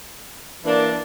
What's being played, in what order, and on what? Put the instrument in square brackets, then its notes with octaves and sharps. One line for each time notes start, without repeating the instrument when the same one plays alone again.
[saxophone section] E3 A#3 D4